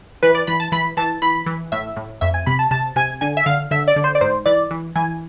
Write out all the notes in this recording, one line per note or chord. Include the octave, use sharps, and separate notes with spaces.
E3 B4
D5
E3 B5
A5
E3 B5
E3 A5
E3 B5
E3
A2 E5
A2
F2 E5
G#5
C3 B5
A5
C3 A5
C3 G#5
D3 G#5
E5
D3 F5
D3 E5
D5
D3
C5
D5
G#2 C5
E3 D5
E3
E3 G#5